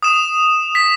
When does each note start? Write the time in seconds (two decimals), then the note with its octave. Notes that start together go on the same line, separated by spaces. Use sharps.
0.03 D#6 E7
0.75 B6